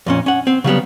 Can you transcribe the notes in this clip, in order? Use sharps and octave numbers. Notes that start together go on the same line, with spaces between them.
F2 A#2 C#4
C#4 F#5
C4
C#3 F#3 G3 B3